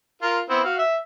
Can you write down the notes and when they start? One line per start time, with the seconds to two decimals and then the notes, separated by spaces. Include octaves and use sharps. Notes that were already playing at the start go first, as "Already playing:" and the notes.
0.22 F4 A#4
0.49 B3 C4 E4
0.64 F#4 F5
0.79 E5